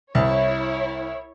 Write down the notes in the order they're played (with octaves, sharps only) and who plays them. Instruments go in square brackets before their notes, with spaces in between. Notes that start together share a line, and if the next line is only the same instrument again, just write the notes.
[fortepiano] C2 [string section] E4 C#5